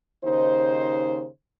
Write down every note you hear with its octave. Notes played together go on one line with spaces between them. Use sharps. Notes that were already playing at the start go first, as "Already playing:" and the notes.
D#2 C#3 D#4 C5